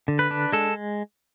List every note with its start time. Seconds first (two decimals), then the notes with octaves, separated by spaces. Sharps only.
0.08 D3
0.19 B4
0.31 D4
0.53 G#3 A4